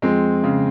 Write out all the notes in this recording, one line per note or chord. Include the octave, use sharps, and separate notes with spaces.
F2 G#3 C4
C#3